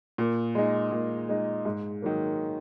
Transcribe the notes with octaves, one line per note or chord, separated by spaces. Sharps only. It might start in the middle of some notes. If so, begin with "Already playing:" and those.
A#2
G#3 D#4
A#2
G#3 D#4
G#2
D#3 F#3 A#3